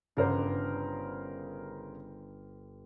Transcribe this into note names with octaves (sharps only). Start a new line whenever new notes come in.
G1 C#3 A#4 C5